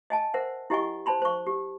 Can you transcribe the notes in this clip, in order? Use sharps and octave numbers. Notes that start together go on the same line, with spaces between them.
D#5 G#5 A5
A#4 C5 E5 F#5
E4 G4 D#5 F#5 G#5 C#6
C5 D5 A5 B5 C6
C5 C#6
G4